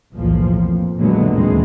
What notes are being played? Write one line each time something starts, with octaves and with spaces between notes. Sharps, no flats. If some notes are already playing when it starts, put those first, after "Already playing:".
B1 E2 A2 F3 A#3
F2
A#2 D3 F#3 G#3 A3 B3
D#2 B2 D3 E3 G#3 C4